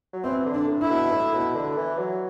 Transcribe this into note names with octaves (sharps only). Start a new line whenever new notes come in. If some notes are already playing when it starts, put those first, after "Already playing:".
F#3
E3 C4
D3
D4
A2
E4
B2
A2
B2
D3
E3
F#3